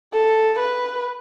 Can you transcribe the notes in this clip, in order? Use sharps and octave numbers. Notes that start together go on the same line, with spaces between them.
A4
B4